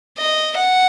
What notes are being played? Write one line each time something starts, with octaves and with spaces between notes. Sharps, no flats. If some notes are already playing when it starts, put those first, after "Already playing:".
D#5
F#5